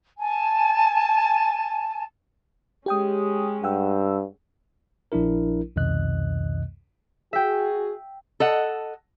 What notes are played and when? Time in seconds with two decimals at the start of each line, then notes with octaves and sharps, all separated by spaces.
0.19 G#5 A5
2.86 G#3 C#4 G4 G5 D#6
3.64 G2 F#5 G5 E6
5.12 A#1 F3 D4 E4 A#4
5.76 C2 F2 B2 D#3 D#5 F#6
7.33 F#4 G#4 E5 G5
8.40 A4 D#5 F#5